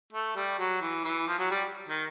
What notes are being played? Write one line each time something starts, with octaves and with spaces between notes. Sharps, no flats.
A3
G3
F#3
E3
E3
F3
F#3
G3
D#3